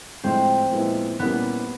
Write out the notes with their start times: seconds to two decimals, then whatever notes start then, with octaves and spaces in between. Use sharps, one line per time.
0.23 A2 F3 G#3 C4
0.71 A#2 F3 G#3 B3 E4
1.19 A#2 G3 A#3 B3 C#4 E4